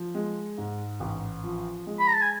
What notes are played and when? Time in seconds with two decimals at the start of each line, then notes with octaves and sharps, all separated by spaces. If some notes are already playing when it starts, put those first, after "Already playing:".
Already playing: F3
0.15 G#3
0.58 G#2
1.00 A1
1.44 F3
1.87 G#3
1.99 B5
2.07 A#5
2.14 A5
2.22 G#5